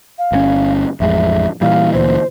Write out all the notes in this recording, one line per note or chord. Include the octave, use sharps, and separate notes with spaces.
F5
G1 D3 C#4
A1 F2 G#3 E5
A#2 E3 G3 F5
D2 A#2 E3 C5